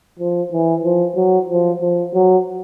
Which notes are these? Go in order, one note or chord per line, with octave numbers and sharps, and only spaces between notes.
F3
E3
F3
F#3
F3
F3
F#3